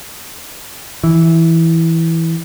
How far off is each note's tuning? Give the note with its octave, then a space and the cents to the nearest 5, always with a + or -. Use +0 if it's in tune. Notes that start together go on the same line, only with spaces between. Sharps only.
E3 -5